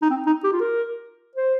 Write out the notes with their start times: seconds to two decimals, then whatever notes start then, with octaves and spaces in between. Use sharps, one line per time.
0.02 D#4
0.10 C4
0.27 D#4
0.44 G4
0.52 F4
0.61 A#4
1.36 C5